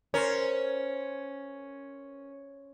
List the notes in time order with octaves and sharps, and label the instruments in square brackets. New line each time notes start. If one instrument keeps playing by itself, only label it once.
[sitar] C#4 [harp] A#4 C5